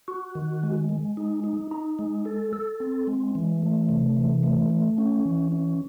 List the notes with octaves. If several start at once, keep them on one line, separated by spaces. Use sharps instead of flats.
F#4
D#3
G#3
G#3
D#4
D#4
D#4
G#3
A4
A4
C4
G#3
E3
A3
C3
E3
A3
A3
C#4
E3
C#4